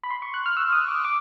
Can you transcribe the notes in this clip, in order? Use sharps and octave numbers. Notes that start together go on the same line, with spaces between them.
B5
C6
C#6
F#6
F6
E6
D#6
D6
D6